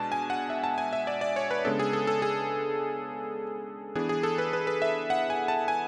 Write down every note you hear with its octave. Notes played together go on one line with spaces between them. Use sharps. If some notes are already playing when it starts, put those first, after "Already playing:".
Already playing: B2 G#3 D4 A5
G#5
F#5
E5
A5
G#5
E5
D5
D5
C#5
B4
C#3 G#3 B3 D4 A4
G#4
A4
A4
G#4
E3 B3 D4 G#4
G#4
A4
B4
B4
B4
E5
F#5
G#5
A5
G#5